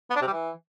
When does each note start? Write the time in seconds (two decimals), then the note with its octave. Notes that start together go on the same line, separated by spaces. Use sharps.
0.10 B3
0.16 D4
0.22 C3
0.27 G3
0.33 E3